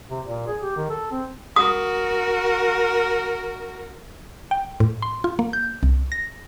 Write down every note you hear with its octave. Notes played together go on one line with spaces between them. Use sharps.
C3
A#2
G#4
G4
D#3
A4
C4
F#4 A#4 D#6
G5
A2
C6
F4
A#3
G6
C2
A#6